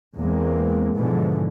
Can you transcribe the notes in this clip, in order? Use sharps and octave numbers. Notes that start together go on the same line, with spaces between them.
E2 G#3 A#3 C4
G#2 B2 D3 E3 F3 G#3